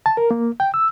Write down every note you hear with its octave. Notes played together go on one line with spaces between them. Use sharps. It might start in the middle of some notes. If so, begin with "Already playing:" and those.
A5
A#4
A#3
G5
E6